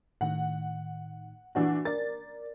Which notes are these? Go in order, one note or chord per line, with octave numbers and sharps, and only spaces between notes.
A2 D#3 F#5
E3 D4 F#4
A#4 D5 A6